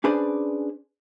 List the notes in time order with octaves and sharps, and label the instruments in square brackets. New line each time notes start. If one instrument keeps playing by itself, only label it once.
[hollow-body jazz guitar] C#4 D4 G#4 B4 C5 D5